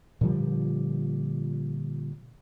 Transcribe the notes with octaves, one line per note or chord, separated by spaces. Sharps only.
A#2 D3 F3 G3